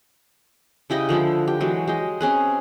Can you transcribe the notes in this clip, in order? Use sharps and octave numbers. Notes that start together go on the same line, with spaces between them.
C#3 E4 G4 D#5
D3 F3 G#3 E4
G4
E3 F#3 G#3
G#3 G4 D#5
C4 C#4 G#4 B4